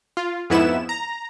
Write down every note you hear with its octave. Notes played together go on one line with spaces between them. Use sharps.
F4
F2 G#2 B3 E4 E7
A#5